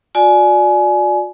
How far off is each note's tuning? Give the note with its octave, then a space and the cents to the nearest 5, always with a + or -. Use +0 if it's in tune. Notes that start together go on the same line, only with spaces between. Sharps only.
F#4 -45 D5 +5 G#5 +25